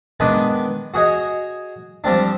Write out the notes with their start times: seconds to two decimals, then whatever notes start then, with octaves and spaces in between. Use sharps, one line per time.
0.20 D#3 G#3 B3 D4 B4
0.94 F#4 G#4 C#5 D#5
2.04 F3 G3 C4 D4